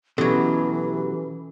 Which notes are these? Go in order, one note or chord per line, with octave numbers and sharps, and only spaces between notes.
B2 E3 F#3 C#4 G4 A4